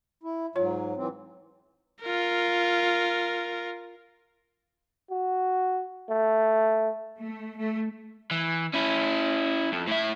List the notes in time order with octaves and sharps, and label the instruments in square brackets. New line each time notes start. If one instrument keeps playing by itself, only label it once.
[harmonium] E4
[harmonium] G#2 F#3 [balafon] F4 C#5
[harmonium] E3 F#3 C4
[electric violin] F4 A#4
[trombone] F#4
A3
[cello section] A3
A3
[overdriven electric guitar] E3
C#4 E4
F2
A2 E5